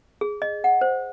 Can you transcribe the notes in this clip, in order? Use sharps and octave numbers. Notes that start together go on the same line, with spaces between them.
G#4
D#5
F#5
C5